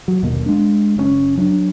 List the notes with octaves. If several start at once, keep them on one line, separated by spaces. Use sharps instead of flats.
F#3
G1 D#2 B2 A#3
G#3 D4
F#1 A#2 C#4
F#3 D4